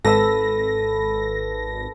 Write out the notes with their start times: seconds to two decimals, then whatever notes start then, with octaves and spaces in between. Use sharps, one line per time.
0.04 G#1 A4 B4 E6 A#6